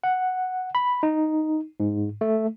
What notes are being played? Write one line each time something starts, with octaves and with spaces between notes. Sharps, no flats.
F#5
B5
D#4
G#2
A3